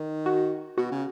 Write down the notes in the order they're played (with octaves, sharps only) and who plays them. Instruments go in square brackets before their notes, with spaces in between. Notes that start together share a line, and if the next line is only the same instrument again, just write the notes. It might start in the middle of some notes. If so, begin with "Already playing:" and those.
Already playing: [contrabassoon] D#3
[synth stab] F#4
[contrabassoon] B2 [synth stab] F#4
[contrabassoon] C#3